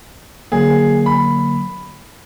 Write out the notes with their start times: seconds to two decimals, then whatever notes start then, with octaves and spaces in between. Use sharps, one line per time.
0.52 D3 F#3 A#3 G#4
1.06 B5